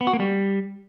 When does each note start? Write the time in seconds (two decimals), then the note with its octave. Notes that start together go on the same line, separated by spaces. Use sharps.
0.01 B3
0.07 F#4
0.13 A#3
0.20 G3